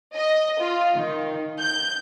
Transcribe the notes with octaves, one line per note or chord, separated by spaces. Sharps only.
D#5
F4
D#3
G6